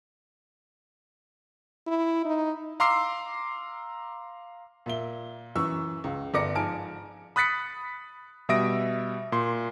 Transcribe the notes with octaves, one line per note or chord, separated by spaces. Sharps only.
E4
D#4
F5 A#5 C6 D6 E6 C7
A#2 E5 G7
F#2 E3 C#6 E6
C#2
G1 B3 D5 D6 A#6 C#7
G#2 F3 G#5 A5 F6 D7
B5 D#6 F#6 A6 B6 C#7
B2 G3 E5 D#6 A#6 D7
A#2 C6